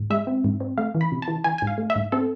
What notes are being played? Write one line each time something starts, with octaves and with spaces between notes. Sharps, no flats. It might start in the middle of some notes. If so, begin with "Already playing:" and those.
Already playing: G#2
G#3 E5
C4
G#2
C4
A3 F5
E3
B5
C3
A5
E3
E3 G#5
G#2 G#5
F5
A3
E5
G#2
C4 A4